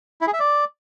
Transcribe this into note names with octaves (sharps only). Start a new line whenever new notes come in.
E4
G#4
E5
D5